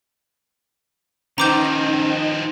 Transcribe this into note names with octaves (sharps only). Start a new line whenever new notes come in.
D#3 F3 C#4 D#4 C5 A#5 D6 G6